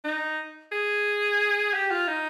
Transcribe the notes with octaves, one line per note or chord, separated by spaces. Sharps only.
D#4
G#4
G4
F4
D#4